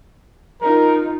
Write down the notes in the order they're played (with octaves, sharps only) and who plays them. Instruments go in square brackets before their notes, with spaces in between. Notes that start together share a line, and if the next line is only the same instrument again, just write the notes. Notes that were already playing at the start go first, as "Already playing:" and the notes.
[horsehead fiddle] D#4 F4 [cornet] A#4